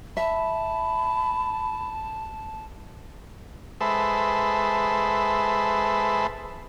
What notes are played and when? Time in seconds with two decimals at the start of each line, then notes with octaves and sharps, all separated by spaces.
0.17 E5 A5 B5
3.81 G#3 A4 B4 C5 E5